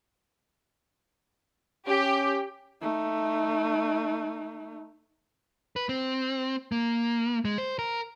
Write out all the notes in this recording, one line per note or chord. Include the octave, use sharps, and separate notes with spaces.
C#4 G4
A3 D#4
B4
C4
A#3
G#3
C5
A#4